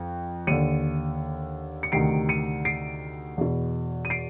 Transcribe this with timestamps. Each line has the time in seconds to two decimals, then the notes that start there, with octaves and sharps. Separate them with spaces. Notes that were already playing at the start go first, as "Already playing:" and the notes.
Already playing: F2
0.47 D#2 D3 C#7 D#7
1.83 C#7
1.92 D2 C3 D#3 C7 D7
2.29 C#7 D#7
2.65 C7 D7
3.38 E2 B2
4.05 D#7
4.10 C7 D7